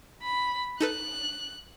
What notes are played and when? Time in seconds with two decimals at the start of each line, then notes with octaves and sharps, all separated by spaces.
0.22 B5
0.80 D#4 A4 B4 F#6